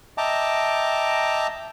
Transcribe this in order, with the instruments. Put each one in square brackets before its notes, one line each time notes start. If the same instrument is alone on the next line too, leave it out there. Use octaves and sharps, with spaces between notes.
[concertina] D#5 E5 G5 A5 A#5 D6